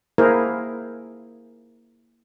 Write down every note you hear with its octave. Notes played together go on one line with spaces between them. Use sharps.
A#3 E4 G#4 A#4 C5